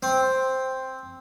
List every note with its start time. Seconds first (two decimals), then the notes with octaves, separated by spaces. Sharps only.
0.03 C4